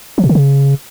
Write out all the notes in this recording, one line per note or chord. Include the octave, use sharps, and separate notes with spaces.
F3
B2
D3
C#3